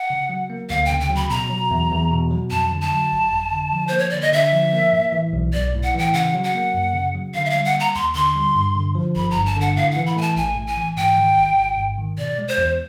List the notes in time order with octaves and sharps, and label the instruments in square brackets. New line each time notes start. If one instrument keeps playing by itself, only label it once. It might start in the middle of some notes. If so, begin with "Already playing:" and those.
Already playing: [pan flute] F#5
[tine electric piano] C#3
F#3
A#3
[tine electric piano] D2 [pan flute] F5
[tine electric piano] C#3 [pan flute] G5
[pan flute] G5
[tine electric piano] F#3
[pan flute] B5
[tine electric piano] B2 [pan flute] A#5
[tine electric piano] F#3
E2
E2
B2
F#3
[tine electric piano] F2 [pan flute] A5
[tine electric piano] D3
[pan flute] A5
[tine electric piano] F#3
G1
F2
D3
F3
[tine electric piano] A#3 [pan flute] C5
[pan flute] C#5
[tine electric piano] D3 [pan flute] D5
[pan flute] D#5
[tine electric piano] D3 [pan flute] E5
[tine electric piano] F3
A#3
A2
E3
B1
[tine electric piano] B1 [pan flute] D5
[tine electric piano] A2
[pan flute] F#5
[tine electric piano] E3 [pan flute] G5
[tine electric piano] C#3 [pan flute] F#5
[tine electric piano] F#3
[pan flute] F#5
[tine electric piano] A#3
F#2
C#3
F#3
[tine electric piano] D3 [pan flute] F5
[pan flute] E5
[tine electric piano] G3 [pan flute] F5
[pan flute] F#5
[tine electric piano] A#3
[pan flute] A#5
[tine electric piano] D#2 [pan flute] C6
[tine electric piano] D3 [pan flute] C6
[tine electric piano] G3
G2
D3
F3
[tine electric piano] G1 [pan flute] B5
[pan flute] A#5
[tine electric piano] G2
[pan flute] A5
[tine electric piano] D3 [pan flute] F#5
[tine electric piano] A2 [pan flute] F5
[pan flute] F#5
[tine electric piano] E3
[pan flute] B5
[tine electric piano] A3 [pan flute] G#5
[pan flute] A5
[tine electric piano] A1 [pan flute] G#5
[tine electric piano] A2
[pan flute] G#5
[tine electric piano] E3
[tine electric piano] G#2 [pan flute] G5
[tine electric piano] D#3
G#1
G#1
G#2
D#3
[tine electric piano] B2 [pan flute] D5
[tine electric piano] G#3
[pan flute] C5
[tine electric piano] E2